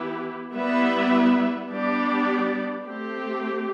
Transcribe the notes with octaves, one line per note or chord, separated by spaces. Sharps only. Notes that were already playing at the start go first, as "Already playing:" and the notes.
Already playing: E3 B3 E4 G4 B4
G3 B3 E4 B4 E5
G3 B3 D4 G4 D5
A3 C4 G4